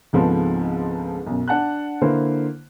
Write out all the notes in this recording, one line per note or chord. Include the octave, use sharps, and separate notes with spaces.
C#2 G#2 F3 B3 C4 A4
B1 F#2
D4 F#5 A5 F#6
D3 A#3 E4 C5